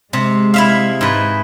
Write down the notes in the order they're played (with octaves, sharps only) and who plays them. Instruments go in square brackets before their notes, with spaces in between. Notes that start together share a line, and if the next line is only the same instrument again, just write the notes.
[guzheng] C3 [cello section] G#3
[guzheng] E4 E5 F5
G#2 B4